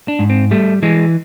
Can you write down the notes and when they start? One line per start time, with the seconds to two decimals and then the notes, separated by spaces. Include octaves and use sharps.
0.08 D4
0.19 G#2
0.30 C4
0.51 G3 A3
0.83 E3 G#3